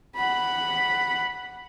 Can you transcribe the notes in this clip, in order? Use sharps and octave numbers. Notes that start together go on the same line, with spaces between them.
F#5 B5